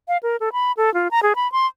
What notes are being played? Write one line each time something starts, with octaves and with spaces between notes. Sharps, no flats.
F5
A#4
A4
B5
A4
F4
A#5
G#4
B5
C6